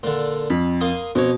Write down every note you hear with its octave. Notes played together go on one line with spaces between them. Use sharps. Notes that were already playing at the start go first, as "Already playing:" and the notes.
A#2 D3
F2 B5
A#3 C6 D#6
F2 B2 C#5